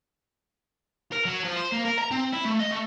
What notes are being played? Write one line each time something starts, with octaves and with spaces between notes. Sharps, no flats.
A#4
F#3
F3
C5
A#3
A#4
A#5
C4
E4
A3
D#5
A3